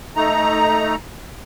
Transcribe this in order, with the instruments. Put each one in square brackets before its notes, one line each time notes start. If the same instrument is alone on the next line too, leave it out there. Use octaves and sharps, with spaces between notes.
[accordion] A3 D#4 A#5